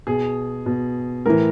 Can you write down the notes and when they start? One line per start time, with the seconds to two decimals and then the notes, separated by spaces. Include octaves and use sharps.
0.07 B2 G#4
0.66 B2
1.26 A2 E3 A#4